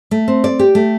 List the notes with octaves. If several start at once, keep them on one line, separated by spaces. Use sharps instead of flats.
A3
C4
D5
G4
A3